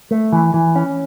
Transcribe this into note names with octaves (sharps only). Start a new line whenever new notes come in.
A3
E3
E3
C#4